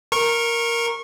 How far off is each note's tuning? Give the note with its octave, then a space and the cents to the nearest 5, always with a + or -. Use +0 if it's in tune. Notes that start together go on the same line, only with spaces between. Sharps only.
A#4 +0 C#6 -25